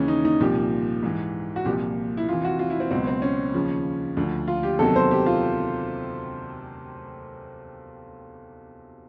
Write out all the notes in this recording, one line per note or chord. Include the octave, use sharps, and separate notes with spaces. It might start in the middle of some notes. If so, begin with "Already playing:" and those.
Already playing: D#2 C#3 E3 C#4
D#4
D#4
C2 A#2 F3 G4
G#2 E3
F#4
C2 A#2 F3 G4
E4
F2 C3 E3 F4
F#4
F4
E4
C4
C#2 B2 F#3 C4
C4
C#4
D#2 C#3 F3
D2 D3 F3
F4
G4
E2 C3 D#3 F#3 A4
C5
G4
F4